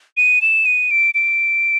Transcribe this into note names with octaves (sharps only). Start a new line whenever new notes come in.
D#7
E7
D#7
D7
D7